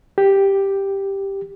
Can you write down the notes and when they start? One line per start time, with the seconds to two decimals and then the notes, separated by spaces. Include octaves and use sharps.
0.18 G4